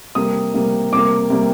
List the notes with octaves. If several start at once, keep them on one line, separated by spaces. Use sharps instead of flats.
C3 G3 A#3 D#6
C3 G3 A#3
C3 G3 A#3 D6
C3 G3 A#3